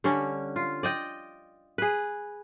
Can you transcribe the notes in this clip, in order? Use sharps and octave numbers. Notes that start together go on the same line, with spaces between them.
D3 G3 C#4
F4
D5 D#5 G5
G#4 B4